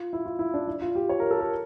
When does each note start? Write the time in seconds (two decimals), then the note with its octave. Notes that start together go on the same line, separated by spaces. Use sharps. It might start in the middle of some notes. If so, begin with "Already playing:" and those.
Already playing: F4
0.13 E4
0.26 F4
0.39 E4
0.54 D4
0.68 E4
0.82 F4
0.95 G4
1.09 C#5
1.20 A#4
1.31 A4
1.41 A#4